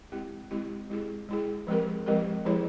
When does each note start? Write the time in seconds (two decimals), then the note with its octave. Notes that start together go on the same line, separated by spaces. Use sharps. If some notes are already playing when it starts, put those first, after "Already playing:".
0.12 G#3 C4 E4 G4
0.51 G#3 C4 E4 G4
0.90 G#3 E4 G#4
1.29 G#3 E4 G#4
1.67 F3 G#3 C4 G4 A#4
2.06 F3 G#3 C4 G4 A#4
2.45 F3 G#3 E4 G#4 C#5